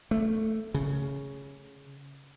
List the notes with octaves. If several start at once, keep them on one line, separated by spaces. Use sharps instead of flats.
A3
C#3